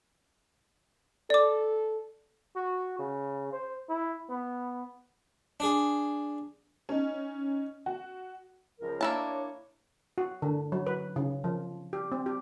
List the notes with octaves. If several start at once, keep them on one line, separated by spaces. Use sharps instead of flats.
A4 D5 D6
F#4
C#3
C5
E4
B3
D4 G#4
C#4 D#4
F#4
C#2 F3 A#4
A#3 D4 E4 C#5 A5
F#4
D3
F#3
B4
C#3
F3
G4
C4
G4